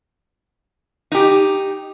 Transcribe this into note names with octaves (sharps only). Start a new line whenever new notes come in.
D#4 G4